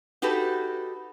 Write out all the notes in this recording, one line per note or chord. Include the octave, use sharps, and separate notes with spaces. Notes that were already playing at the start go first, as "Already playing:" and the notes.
D#4 F#4 G4 A4 B4